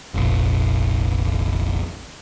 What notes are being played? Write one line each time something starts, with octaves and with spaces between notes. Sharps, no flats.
F1 A#1